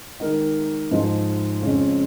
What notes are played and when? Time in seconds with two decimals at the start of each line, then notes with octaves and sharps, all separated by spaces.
0.20 D#3 G#3 D#4 A#4
0.91 G#2 F3 G#3 D#4
1.62 F2 C#3 G#3 C#4